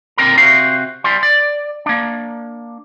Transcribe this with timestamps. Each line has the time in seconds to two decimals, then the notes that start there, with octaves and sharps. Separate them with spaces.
0.18 A#2 D3 G#3 C4 A#4 A#5
0.37 C3 F#4 C5 F5
1.04 G3 C6
1.23 D5
1.86 A#3 D4